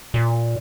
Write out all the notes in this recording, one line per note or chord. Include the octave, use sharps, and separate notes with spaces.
A#2